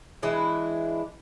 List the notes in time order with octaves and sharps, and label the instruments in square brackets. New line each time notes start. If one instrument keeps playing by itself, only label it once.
[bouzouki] E3 G#3 D4 E4